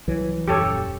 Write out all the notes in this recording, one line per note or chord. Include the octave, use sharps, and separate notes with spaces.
C2 E3 F#3
D#1 F#2 G4 A4 C#5